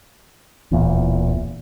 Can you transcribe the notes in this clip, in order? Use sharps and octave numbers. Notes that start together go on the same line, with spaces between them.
D1 E2 A#2